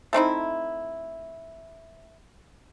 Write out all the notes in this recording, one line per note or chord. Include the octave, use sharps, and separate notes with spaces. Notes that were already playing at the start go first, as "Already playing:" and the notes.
A3 C4 D#4 E4